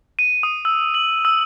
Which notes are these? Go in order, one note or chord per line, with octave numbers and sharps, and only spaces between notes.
D#7
D#6
E6
F#7
E6